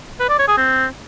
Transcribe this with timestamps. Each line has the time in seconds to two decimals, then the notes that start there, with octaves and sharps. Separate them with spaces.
0.20 B4
0.29 D5
0.39 C#5
0.48 G#4
0.57 C4